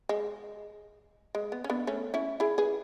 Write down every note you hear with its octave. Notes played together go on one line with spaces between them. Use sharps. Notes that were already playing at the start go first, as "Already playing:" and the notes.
G#3
G#3
B3
C#4
B3 D4
A3 C#4
C#4 E4
E4 G#4
G#4 B4